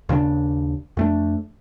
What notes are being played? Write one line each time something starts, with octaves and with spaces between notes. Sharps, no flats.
D#2 C#3 C#4 D4
F2 A3 D4